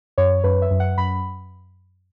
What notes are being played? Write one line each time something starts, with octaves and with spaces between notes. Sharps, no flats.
F#2 C#5
F#2 B4
E5
F#2
F#5
F#2 B5